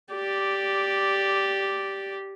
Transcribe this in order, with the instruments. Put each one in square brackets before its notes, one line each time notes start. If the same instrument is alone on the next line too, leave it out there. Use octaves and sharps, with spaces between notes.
[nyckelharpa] G4 D5